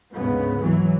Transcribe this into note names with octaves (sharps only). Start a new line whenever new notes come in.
D2 G#2 C#3 B3
E3 F#3